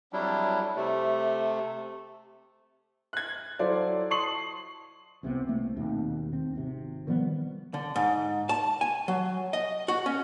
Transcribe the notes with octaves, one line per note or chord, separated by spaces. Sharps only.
F2 F#3 G3 D4 E4
C3 A3
F#6 G#6
F#3 E4 F4 A4 C5 D5
A5 C6 C#6 D#6 C7 F#7
C2 C3 E3 B3
C2 A3 A#3
D#2 B2 C4
C4
G#1 C3
D#3 F3 G3 B3
D3
G#2
A5
G#5
F#3
D#5
F#4
C#4